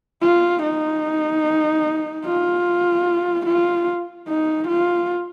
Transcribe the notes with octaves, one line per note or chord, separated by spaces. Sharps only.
F4
D#4
F4
F4
D#4
F4